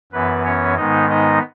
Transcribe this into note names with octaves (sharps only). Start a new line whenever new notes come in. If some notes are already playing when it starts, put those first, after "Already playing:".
F#2 E3 B3 B4
C#4 C#5
G#2 D#3 G#3 B3 D#4 D#5
D#4 D#5